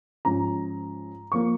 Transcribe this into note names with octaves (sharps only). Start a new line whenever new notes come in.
G#2 F3 C#4 F4 A#5
F3 A#3 C#6